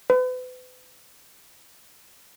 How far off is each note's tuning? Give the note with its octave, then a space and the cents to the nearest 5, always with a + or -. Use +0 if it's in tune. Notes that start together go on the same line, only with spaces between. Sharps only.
B4 +40